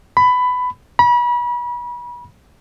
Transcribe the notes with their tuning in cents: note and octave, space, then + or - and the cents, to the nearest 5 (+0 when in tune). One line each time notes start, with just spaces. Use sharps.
B5 +15
B5 -35